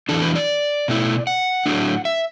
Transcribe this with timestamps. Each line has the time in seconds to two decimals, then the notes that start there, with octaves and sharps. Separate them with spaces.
0.09 E2 E3 D4 A4
0.22 B4
0.35 D5
0.88 B2 A3 E4
1.27 F#5
1.66 A2 F#3 A3 D4
2.05 E5